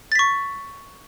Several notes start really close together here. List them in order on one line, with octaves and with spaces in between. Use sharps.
A6 B6 C#6